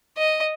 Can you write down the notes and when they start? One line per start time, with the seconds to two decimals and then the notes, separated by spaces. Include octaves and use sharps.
0.18 D#5